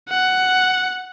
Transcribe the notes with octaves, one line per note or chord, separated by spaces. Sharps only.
F#5